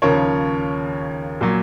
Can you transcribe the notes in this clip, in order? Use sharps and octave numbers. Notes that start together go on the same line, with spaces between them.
D#2 C#3 F3 A#4 C#5
A#2 F#3